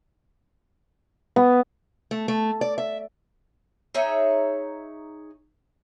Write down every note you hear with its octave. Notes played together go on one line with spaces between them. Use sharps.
B3
A3
A3
D5
E5
D#4 G#4 C#5 E5